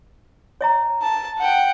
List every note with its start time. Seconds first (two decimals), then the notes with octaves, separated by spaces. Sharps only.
0.61 C#5 E5 A#5
1.02 A5
1.39 F#5 G5